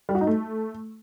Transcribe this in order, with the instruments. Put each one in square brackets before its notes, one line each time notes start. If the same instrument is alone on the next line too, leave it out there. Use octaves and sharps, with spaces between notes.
[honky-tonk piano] G3
F#4
D#4
A3